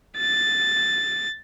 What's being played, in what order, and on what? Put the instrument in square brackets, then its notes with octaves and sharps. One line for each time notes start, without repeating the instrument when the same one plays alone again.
[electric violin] A6